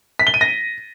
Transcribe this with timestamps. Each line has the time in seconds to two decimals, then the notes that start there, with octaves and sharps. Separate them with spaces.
0.19 B6
0.27 G7
0.34 D#7
0.41 A#6